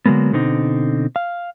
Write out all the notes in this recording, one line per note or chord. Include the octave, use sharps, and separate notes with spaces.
D3 F#3 G#3 A#3 B3
B2 D3 C4 D#4
F5